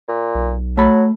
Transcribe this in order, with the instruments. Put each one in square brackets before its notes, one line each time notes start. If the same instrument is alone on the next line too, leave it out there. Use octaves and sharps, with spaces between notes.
[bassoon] A#2
[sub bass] B1
[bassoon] F#3 [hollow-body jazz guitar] A3 B5